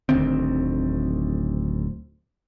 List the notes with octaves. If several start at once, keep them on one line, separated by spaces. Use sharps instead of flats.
D1 D2 D#3 C4